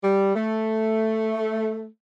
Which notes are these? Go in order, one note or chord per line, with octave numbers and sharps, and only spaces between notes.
G3
A3